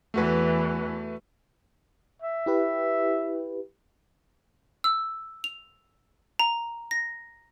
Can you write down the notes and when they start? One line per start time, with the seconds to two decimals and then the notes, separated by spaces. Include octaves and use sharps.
0.14 E2 E3 A3 F#4 B4
2.22 E5
2.46 E4 G4 B4
4.84 E6
5.44 F7
6.39 A#5
6.91 A#6